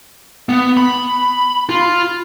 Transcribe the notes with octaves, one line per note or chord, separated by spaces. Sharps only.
B3
B5
F4